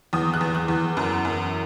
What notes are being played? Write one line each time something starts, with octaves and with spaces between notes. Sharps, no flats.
E2 D#6
F#6
E2
F#6
E2
F#2
F#2